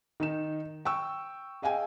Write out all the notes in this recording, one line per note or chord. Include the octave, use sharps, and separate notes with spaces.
D#3 D#4 E7
G5 C#6 E6
G#4 D#5 F5 G5 G#5